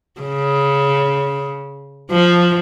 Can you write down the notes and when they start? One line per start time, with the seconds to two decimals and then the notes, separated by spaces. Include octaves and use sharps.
0.21 C#3
2.11 F3